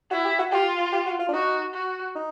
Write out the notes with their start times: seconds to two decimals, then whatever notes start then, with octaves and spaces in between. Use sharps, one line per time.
0.11 E4 F#4
0.25 G4
0.39 F#4
0.52 F4 G4
0.93 G4
1.06 F#4
1.20 F4
1.29 D4
1.33 D#4 F#4
1.74 F#4
2.15 D#4